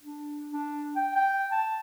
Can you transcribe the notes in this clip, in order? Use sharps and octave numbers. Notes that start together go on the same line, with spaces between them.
D4
D4
G5
G5
A5